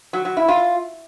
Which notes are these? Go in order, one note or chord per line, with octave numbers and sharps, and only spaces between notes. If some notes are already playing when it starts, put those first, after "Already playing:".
F#3
F#3
E4
F4